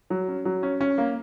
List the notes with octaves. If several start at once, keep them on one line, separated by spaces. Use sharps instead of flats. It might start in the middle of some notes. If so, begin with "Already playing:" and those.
F#3
C#4
F#3
C#4
C#4
A#3